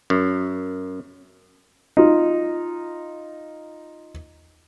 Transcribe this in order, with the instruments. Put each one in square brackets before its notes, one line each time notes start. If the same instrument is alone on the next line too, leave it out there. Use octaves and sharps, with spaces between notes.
[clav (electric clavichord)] F#2
[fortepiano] D#4 F4